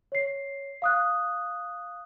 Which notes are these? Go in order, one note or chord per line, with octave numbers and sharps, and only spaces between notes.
C#5 C7
F5 D#6 F#6